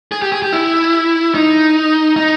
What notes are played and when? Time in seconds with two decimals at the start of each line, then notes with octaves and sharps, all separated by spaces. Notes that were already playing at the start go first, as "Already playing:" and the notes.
0.12 G#4
0.22 G4
0.32 G#4
0.42 G4
0.53 E4
1.34 D#4
2.16 D#4